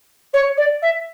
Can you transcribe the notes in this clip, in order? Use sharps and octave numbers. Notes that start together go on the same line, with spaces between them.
C#5
D5
E5